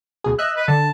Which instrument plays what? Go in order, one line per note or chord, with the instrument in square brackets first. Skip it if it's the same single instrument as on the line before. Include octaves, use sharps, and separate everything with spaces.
[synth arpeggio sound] D2 B2 G#4
[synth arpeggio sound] D#5 F#6 [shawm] E5
[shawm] B4
[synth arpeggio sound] D3 [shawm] A5